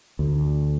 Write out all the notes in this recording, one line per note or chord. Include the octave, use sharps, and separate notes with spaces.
D2